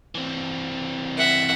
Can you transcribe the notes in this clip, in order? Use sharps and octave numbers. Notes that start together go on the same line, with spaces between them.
E3 C4
E5 F#5